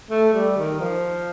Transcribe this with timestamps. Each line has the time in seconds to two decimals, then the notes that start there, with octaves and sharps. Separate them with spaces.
0.11 A3
0.34 G3
0.57 D#3
0.80 F3